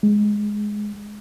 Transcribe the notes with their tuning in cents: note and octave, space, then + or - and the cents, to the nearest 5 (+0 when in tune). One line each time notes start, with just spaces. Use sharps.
G#3 +5